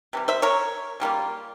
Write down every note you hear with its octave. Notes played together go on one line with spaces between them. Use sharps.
C3 E3 G3
C5 E5
A#4 C#5
C#3 G3 A#3 F4